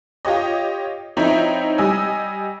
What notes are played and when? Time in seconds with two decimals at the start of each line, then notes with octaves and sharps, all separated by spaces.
0.25 F4 G4 C#5 D#5
1.16 F3 C4 D#4 E4 C#5 E5
1.78 G3 D#5 G#5 E6